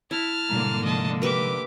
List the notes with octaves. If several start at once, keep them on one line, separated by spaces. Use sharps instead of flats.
E4 A5 F6
G#2 B2 D3 G3 A#3 A#5
C3 F3 G#3 D#5 A5
G4 A#4 B4 E5 D6